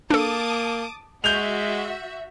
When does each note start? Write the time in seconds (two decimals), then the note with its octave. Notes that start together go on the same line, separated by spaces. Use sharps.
0.10 A#3 D4 A4 A5 D6 D#6
1.24 G#3 F#4 E5 G6 F7